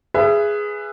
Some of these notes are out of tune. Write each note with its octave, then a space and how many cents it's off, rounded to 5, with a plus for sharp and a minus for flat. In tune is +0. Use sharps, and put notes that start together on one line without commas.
G#4 +0 B4 +0 E5 +30